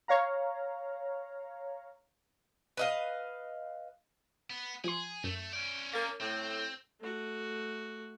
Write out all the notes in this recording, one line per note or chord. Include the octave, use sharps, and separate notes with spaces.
C#5 F5 A#5
B4 D#5 F5
B3
F3 G#4 C6
F#2 A3
C#4 D5
A#3 A6
A2 C4
A3 F#4